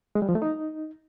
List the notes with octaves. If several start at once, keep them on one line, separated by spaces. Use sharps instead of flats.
G#3
G3
F3
A3
D#4